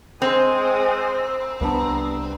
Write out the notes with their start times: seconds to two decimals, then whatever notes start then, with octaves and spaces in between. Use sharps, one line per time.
0.22 G#3 C4 C5 D#6
1.61 C2 G3 B3 D4 A#5